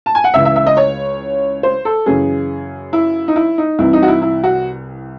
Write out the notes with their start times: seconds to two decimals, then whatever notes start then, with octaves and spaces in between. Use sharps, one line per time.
0.06 A5
0.15 G#5
0.24 F#5
0.34 C#2 C#3 E3 E5
0.45 E5
0.56 E5
0.66 D#5
0.77 C#5
1.63 C5
1.85 A4
2.06 F#2 C#3 E3 G#4
2.93 E4
3.28 D#4
3.36 E4
3.58 D#4
3.78 C2 C3 E3 E4
3.93 D#4
4.03 F#4
4.08 E4
4.22 E4
4.44 F#4